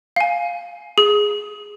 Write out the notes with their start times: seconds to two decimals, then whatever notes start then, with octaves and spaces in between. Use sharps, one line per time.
0.16 F5 G#5
0.98 G#4